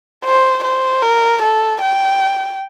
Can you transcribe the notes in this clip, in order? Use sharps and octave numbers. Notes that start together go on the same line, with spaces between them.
C5
C5
A#4
A4
G5